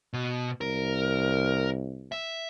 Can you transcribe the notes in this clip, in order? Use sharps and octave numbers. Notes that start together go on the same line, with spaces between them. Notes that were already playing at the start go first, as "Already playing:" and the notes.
B2
C2 A#4
E5